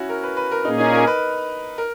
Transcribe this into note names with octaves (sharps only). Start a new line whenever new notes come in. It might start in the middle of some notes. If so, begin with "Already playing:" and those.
Already playing: C#4 E4 F#4
A#4
B4
B4
A#4
A#2 A#3 C#4 D#4 G#4
D#4
A#4
B4
A#4